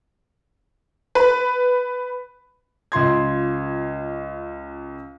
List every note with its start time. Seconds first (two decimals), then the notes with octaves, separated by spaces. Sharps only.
1.15 B4
2.92 C#2 F4 C6 G#6